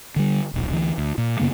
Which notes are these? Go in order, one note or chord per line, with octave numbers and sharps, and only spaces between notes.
D3 G3
D#1 B1
D2 E3
D2
A#2
F#2 C#3 A#3 B3